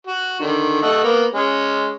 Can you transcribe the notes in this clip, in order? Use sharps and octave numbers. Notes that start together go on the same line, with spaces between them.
F#4
D3 D#3
A3 D#5 F#5
A#3 B3
G#3 C#4